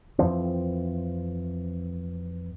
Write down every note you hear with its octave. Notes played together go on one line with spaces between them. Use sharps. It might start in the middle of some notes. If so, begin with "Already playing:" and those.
F2 E3 F3 C4